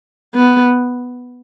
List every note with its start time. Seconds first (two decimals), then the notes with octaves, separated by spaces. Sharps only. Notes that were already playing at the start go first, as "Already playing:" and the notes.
0.35 B3